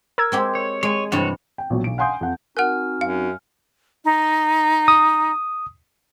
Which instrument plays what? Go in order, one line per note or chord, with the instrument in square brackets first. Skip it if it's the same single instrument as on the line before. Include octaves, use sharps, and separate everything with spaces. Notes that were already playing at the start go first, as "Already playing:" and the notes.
[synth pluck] A#4 E6 G#6
[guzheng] G#3 C4 G4
[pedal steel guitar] C#5
[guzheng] G#3 [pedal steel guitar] C#5 G#5
[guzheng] G2 C3 E3 [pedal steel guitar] F#4 C#5
[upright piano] G5
A#1 B2 F#3
B1 D7
F5 F#5 G#5 C6 D#6 G6
F2 F#5
[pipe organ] C4 D#4 F#4 [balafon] A#4 F#5 [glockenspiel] G#5 F6
[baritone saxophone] F#2 [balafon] F5
[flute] D#4
[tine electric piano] D#6